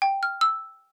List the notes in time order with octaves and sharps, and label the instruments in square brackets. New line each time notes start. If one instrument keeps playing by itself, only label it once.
[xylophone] G5
F6
E6